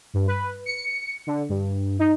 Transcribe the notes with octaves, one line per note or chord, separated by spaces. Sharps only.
G2
B4
C#7
D3
G2
D#4